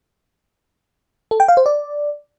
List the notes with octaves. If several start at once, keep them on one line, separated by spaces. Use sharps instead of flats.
A4
G5
F5
C5
D5